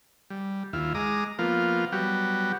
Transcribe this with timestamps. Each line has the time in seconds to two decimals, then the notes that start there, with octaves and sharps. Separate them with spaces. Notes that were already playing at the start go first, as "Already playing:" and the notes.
0.30 G3
0.73 D#2 E4 F4
0.95 G#3 A#5 D6 D#6
1.39 F3 A#3 B3 F4
1.92 F#3 G3 B3 F#4 G4